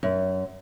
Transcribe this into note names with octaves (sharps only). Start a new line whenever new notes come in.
F#2